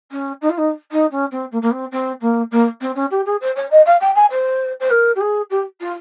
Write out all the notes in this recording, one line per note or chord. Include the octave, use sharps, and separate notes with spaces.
C#4
D#4
F4
D#4
D#4
C#4
C4
A#3
A#3
C4
C4
A#3
A#3
C4
C#4
G4
G#4
C5
C#5
D#5
F5
G5
G#5
C5
C5
A#4
G4
G#4
G4
F4